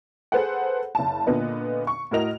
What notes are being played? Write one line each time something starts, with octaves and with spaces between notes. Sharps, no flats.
G#4 A4 B4 C5 F#5
F#1 A5
A#2 D3 B3 D#5
C#6
A2 E4 F#4 A#4 D#5 F7